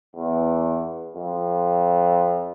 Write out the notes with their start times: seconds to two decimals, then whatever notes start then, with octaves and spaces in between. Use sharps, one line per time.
0.16 E2
1.16 F2